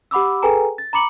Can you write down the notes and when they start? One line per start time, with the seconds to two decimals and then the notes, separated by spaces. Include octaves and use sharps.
0.11 G4 F#5 B5 D6 E6
0.42 G#4 A4 B4 G5 G#5 A#5
0.78 A6
0.93 A#5 B5 D6 C#7 F#7